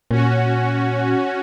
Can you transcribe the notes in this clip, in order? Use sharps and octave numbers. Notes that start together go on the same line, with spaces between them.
A#2 C#4 F#4